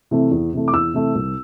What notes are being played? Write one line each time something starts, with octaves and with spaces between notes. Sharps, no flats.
C3 E3 A3
E2
C3 E3 A3
D6
E2 E6
C3 E3 A3
C2